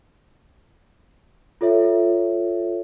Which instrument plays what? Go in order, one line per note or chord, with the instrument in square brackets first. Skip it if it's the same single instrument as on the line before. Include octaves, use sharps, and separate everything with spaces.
[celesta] F4 A4 C#5 E5